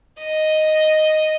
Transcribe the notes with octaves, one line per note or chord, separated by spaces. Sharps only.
D#5